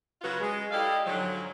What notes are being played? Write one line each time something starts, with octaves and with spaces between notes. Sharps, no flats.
C#3 F#3 F4 F#4 B4
G#3
E4 G4 A4 D5 D#5 F5
G#2 D3 F3 F#3